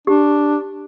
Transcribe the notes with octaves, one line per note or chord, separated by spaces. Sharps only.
D4 G4